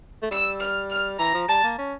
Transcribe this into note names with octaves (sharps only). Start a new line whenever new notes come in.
A3
G3 E6
F6
F6
E3 A#5
F3
G3 A5
A#3
C#4